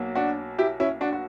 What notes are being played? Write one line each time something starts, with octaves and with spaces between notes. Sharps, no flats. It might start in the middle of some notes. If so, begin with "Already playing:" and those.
Already playing: B1 B2 F#3 A#3
D4 F#4
E4 G4
C#4 E4
D4 F#4
F#4